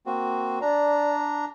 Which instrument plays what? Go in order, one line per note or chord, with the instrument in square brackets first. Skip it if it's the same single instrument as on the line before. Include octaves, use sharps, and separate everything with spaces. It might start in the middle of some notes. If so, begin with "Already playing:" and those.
[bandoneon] A#3 C4 F#4
[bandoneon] D4 A#5 [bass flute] D5